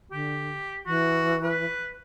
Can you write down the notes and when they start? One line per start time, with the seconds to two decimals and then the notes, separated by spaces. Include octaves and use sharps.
0.12 D3 G4
0.86 E3 F#4
1.43 B4